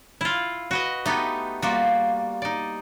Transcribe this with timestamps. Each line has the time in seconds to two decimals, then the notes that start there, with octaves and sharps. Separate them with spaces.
0.21 E4 F4
0.71 F#4 B4 D#5
1.06 A3 B3 D#4 G4
1.62 G3 A#3 F4 F#4
2.42 D#4 D5